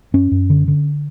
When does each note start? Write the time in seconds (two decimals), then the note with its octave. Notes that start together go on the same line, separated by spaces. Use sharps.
0.14 F#2 C#4
0.31 F#2
0.50 D3
0.68 D3